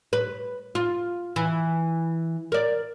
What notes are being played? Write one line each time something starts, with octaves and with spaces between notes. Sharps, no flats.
B4
F4
E3
A#4 D5